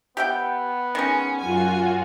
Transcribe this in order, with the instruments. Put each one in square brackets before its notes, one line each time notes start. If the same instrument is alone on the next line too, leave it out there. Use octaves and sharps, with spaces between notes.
[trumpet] B3 [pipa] G4 E5 G5
[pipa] D#3 G#3 [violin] C#4
[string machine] F#2 F4 F#4 [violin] G#5